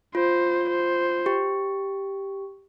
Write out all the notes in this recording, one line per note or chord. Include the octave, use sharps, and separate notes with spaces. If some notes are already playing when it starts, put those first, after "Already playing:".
F4 C5
C5
G4